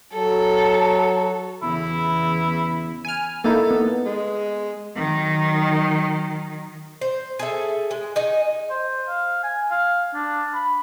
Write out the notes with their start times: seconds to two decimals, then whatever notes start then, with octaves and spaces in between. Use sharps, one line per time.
0.14 F#3 A4
1.62 E2 C#3 E3 E4
3.05 G#5 F6
3.44 A#3 D#4 E4 A4
3.71 B3
4.05 G#3
4.96 D#3 F#3
7.01 C5
7.39 G#4 A4 E5
7.91 G#3
8.16 D#4 D#5 G#5
8.70 C5
9.09 F5
9.44 G#5
9.71 F5
10.14 D4
10.54 B5